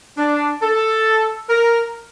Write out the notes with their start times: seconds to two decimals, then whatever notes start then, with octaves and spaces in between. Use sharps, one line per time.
0.18 D4
0.62 A4
1.50 A#4